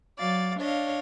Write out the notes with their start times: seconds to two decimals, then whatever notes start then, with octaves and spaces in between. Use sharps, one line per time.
0.18 F#3 D5 F5 A6
0.59 D4 C#5 D#5 F5